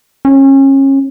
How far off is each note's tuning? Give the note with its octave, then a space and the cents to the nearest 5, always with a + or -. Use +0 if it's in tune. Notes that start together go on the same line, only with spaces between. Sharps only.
C#4 -30